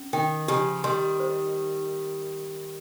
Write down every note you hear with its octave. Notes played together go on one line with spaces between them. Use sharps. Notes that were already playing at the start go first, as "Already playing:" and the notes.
Already playing: C#4
D#3 G5
C#3 F3 G4
D#3 G3 C6
C5